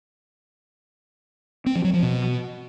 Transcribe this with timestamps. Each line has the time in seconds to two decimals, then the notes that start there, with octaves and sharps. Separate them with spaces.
1.66 C4
1.75 F3
1.84 F#3
1.94 F3
2.03 B2